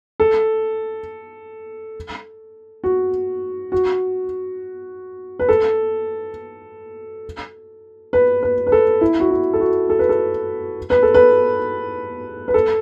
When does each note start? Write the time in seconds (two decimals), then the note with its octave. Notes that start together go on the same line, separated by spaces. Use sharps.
0.20 A4
2.84 F#4
3.72 F#4
5.39 B4
5.49 A4
8.13 B4
8.43 B4
8.67 B4
8.72 A4
9.01 E4
9.20 F#4
9.31 E4
9.53 A4
9.60 F#4
9.90 A4
9.99 B4
10.09 A4
10.90 B4
11.03 A4
11.14 B4
12.48 B4
12.54 A4